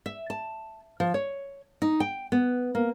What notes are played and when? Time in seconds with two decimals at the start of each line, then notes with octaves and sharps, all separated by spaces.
0.06 E5
0.30 A5
1.00 F3
1.14 C#5
1.82 D#4
2.00 G5
2.32 B3
2.75 A#3